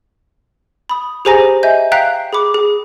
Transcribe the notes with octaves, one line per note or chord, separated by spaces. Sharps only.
B5 D#6
G4 G#4 C5 G#5 A#5 A#6
D#5 E5 G#5 G6
F5 G5 A#5 F#6 G6 B6
G#4 B5 D6
G#4